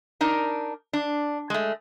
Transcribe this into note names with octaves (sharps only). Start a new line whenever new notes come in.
D4 D#4 A#4
D4
G#3 A3